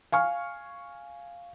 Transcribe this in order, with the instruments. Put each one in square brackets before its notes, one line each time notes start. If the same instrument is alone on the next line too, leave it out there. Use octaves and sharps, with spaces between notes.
[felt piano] F5 G#5 C#6 F6